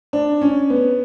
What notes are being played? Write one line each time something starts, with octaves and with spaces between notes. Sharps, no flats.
D4
C#4
B3